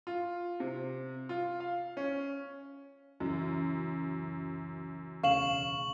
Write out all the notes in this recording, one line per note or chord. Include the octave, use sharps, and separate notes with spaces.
F4
C3
F4
F5
C#4
C#2 F#2 E3
E1 D2 C#3 F5 C#6 E7 F#7